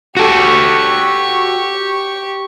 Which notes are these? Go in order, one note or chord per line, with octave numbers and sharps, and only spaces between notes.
F#4 G4 A4 C#6